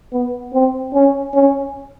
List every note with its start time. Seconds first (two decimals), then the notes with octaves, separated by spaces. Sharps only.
0.12 B3
0.53 C4
0.94 C#4
1.35 C#4